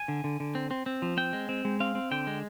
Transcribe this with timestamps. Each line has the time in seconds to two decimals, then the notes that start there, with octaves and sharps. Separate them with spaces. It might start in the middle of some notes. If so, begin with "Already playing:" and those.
Already playing: G#5
0.08 D3
0.24 D3
0.40 D3
0.55 C4
0.71 C4
0.86 C4
1.02 F3
1.17 C4 G5
1.33 G#3
1.49 C4
1.65 G#3
1.80 C4 F5
1.95 C4
2.11 D3 G5
2.27 G#3